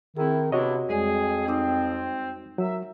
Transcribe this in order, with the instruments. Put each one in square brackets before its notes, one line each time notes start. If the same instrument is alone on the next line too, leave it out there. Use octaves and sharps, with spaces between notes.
[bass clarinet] D#3 [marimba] C4 G#4 [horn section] E4
[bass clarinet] C3 [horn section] B3 D4 E4 [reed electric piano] F#4 C#5 D#5
[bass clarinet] F2 [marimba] G3 G#3 D5 [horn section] G#4
[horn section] C4 [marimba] D#4 D6 D#6
[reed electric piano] F#3 [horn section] A#4 E5